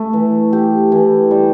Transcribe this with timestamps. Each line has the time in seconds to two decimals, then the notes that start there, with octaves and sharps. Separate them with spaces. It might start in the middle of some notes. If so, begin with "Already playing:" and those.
Already playing: A3
0.13 E3
0.53 G4
0.92 E3
1.31 G3